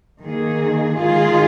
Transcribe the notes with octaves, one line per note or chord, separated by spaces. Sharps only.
D#3 A#3 G#4
D#3 G#3 F4 G#4